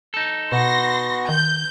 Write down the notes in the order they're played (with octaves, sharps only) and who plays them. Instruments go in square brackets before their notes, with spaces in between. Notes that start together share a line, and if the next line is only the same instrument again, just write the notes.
[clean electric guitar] D#4 A4
[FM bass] B2 [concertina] B3 F#4 C#6 [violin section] C6 A#6
[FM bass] D#3 [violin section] G6